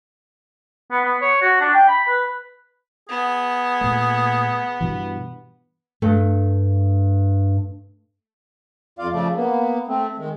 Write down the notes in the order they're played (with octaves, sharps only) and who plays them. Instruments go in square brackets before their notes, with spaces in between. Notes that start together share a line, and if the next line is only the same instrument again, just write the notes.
[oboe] B3
B3
C#5
F#4
D4
G5
B5
B4
[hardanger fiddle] B3 [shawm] G#4
[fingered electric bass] A#2 A3
G2 B2 E3
[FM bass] G2 [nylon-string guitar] A3
[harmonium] F2 F4 D5 F5
C#3 F3 A3 D5
A#3 B3
A3 C4
D#3 G#3